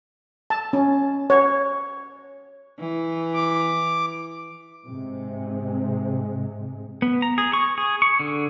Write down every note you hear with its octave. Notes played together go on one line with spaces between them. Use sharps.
A5
C#4
C#5
E3
D6
G#2 C3 G#3
B3
A#5
G#4
C#6
G#4
C#6
D3